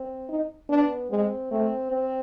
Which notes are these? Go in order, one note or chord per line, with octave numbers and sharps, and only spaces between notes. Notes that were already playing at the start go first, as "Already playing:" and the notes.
Already playing: C4
D#4
B3 D4
G#3 C4
A3 C4
C4